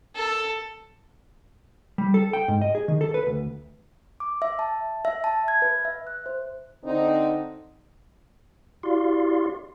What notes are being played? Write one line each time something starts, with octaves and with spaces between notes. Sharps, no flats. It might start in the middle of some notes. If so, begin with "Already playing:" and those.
A4
G3
A4
G5
G#2
D#5
G#4
D#3
A4
B4
D2
D6
E5
A5
E5
A5
G#6
B4
E5
F#6
C5
D3 C4 D#4
E4 F#4 G4 D5 F5 C6